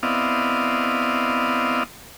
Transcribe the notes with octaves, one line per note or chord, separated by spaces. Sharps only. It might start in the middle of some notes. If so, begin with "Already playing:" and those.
B3 C4 E4 D5 D#5 F5